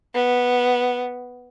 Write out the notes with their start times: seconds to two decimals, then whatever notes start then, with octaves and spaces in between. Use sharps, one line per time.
0.15 B3